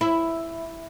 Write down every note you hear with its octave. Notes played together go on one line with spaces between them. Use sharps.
E4